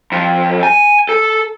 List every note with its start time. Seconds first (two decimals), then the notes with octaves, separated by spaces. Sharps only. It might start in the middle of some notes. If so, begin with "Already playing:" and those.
0.12 F2
0.63 G#5
1.09 A4